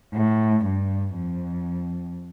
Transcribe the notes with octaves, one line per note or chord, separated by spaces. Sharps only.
A2
G2
F2